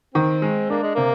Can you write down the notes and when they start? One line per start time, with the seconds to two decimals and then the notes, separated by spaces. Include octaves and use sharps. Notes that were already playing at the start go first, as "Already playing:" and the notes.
0.15 D#3 C4
0.42 G#3
0.70 A#3 D4
0.83 G#3
0.95 C3 A#3